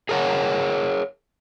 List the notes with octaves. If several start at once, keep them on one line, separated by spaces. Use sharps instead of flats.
G#4 A#4 C#5 F#5